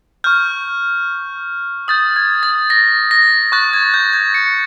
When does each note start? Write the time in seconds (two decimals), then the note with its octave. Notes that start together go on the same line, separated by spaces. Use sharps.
0.24 C#6 F6 G6
1.88 D#6 G6 A6
2.16 G#6
2.43 A6
2.70 A#6
3.11 A#6
3.52 C#6 F#6 A6
3.73 G#6
3.94 G6
4.13 G#6
4.34 C#7